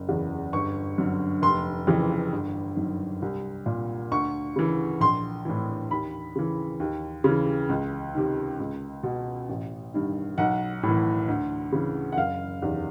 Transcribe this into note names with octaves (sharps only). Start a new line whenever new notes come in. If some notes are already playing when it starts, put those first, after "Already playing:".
Already playing: F#1
E2 C#3 E3
G1 C#6
F#2 D3
F1 C6
F2 C#3 E3
G1
F#2 D#3
C2
A#2
D2 C#6
C#3 E3
A#1 C6
A2 E3
D#2 B5
C#3 E3
D#2
C#3 E3
C#2
C3 D#3
C#2
B2
A1
G2 D#3
B1 F#5
A2 E3
D2
C#3 E3
F#5
F#1 F5
E2 C3 D#3